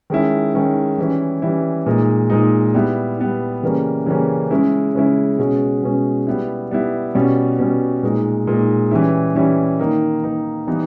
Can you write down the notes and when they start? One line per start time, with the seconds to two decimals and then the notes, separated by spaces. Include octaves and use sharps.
0.10 D#3 G#3 C#4 E4
0.54 D#3 G#3 C#4 E4
0.98 E3 G3 C#4 E4
1.42 E3 G3 C#4 E4
1.86 A#2 G#3 D#4
2.30 A#2 G#3 D#4
2.74 G3 B3 E4
3.18 G3 B3 E4
3.62 C#3 E3 G3 A#3 C#4
4.06 C#3 E3 G3 A#3 C#4
4.51 C#3 G#3 C#4 E4
4.95 C#3 G#3 C#4 E4
5.39 B2 G#3 C#4
5.83 B2 G#3 C#4
6.27 G3 B3 E4
6.71 G3 B3 E4
7.15 B2 G3 C#4
7.59 B2 G3 C#4
8.03 A#2 G#3 D#4
8.47 A#2 G#3 D#4
8.91 E3 G3 C#4 E4
9.35 E3 G3 C#4 E4
9.80 D#3 A#3 D#4
10.23 D#3 A#3 D#4
10.67 E3 G3 B3 D#4